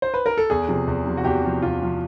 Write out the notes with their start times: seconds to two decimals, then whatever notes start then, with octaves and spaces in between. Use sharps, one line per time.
0.02 C5
0.14 B4
0.26 A#4
0.38 A4
0.50 E2 G#4
0.68 C3 F3
0.87 E2
1.06 C3 F3
1.17 F#4
1.25 E2 G4
1.44 C3 F3
1.62 E2 F4
1.82 C3 F3